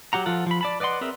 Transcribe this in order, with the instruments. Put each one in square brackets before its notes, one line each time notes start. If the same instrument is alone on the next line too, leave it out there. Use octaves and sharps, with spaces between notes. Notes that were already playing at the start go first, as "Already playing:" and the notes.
[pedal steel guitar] F#3 G4 F#5 A#5
F3 F4 A4 F#5
F3 B5
D5 A5 B5
B4 D5 D#5 F#5 C6
C4 G#4 A#4 B4 E5